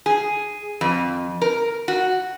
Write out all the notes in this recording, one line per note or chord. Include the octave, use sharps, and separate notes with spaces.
G#4
F2
A#4
F#4